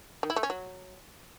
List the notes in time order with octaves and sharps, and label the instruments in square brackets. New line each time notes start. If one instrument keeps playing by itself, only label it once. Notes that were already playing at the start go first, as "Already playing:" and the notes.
[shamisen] D#3
E4
A3
C#4
F#3